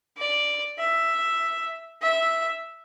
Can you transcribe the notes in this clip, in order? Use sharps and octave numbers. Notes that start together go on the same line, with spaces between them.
D5
E5
E5